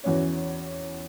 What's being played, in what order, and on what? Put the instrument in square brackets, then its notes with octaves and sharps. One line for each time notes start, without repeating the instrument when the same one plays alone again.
[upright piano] E2 E3 C#4 F#4 C#5